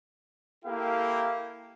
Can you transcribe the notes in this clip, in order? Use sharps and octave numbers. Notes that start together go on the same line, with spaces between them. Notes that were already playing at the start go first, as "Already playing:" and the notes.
A#3 E4 G4 A4 F5 G5